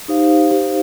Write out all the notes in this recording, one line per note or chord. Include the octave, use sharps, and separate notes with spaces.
D#4 G4 C5 F5
D#4 G4 C5 F5